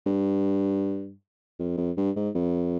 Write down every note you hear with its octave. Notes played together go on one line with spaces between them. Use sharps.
G2
F2
F2
G2
G#2
F2